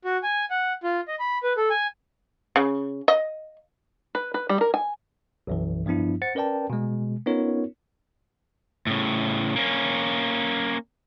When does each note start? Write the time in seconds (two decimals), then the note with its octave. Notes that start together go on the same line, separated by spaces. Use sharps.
0.05 F#4
0.23 G#5
0.50 F#5
0.83 F4
1.08 D#5
1.19 B5
1.43 B4
1.57 A4
1.70 G#5
2.56 C#3
3.08 D#5
4.15 B4
4.34 B4
4.49 G3
4.61 A#4
4.74 G#5
5.47 B1 F#2 E3
5.86 G2 F3 B3 D4 E4
6.22 C5 F#5 A6 C#7
6.35 C#4 A#4 B4 D5 G5 A5
6.70 B2 G#3
7.26 B3 C#4 D#4 F4 A#4 C#5
8.87 A2 C#3
9.56 A#3 C#4